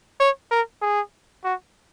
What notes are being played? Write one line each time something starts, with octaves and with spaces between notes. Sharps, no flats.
C#5
A#4
G#4
F#4